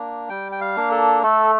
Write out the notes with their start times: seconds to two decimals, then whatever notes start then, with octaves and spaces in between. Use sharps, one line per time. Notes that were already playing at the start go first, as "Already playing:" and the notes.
Already playing: A#3 D4
0.29 G3 G5
0.52 G5
0.61 F5
0.76 A#3 D4
0.91 A4
1.23 A3 A4